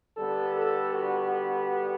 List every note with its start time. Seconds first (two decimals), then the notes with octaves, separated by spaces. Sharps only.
0.17 D3 G3 B3 A4
0.56 A4
0.95 F#4